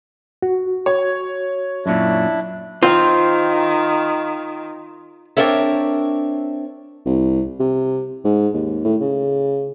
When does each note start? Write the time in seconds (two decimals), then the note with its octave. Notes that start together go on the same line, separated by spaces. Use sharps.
0.42 F#4
0.86 C#5
1.86 F#2 A#2 D4 E4
2.83 D#3 C4 F4 C6
5.37 C4 D4 A#4 C#5 E5
7.06 C2
7.60 C3
8.25 G#2
8.54 D#2
8.85 A2
9.01 C#3